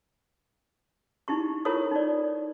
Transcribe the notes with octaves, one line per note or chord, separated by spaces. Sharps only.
D#4 E4 G4 C#6
E4 F4 A4 A#4 C#5 D#6
D#4 D5